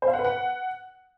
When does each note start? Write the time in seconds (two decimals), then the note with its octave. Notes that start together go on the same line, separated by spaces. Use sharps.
0.02 C5
0.08 F5
0.13 F#5
0.19 B4
0.25 F#5